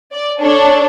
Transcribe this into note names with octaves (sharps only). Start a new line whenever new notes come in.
D5
D4 A4 C#5